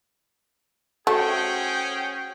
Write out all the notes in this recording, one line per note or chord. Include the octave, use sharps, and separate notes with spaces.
A3 C#4 F#4 G#4 C5 C#5 G5